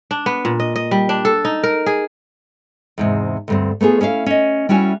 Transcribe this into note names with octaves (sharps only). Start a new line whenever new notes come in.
D4
B3
A#2
D#5
D#5
G3
D4
A4
D#4
A#4
G#4
E2 G#2 C3
D2 G2 C4
A3 B3 F4 G#4
C#4 E4 E5 F5
C#4 D#5
G3 C#4 E4 F#4 G#5